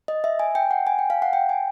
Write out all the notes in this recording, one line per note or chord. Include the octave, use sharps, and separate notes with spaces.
D#5
E5
G#5
G5
F#5
G#5
G5
F5
F#5
G5
G#5